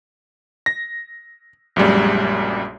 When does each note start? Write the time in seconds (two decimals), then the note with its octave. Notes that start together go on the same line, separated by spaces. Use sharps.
0.66 A#6
1.76 A#1 F#2 G3 G#3